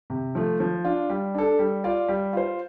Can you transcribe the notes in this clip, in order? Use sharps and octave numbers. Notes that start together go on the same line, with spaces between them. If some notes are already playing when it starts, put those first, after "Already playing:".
C3
F3 A3
F3
D4 F4
G3
D4 A4
G3
F4 D5
G3
F4 C5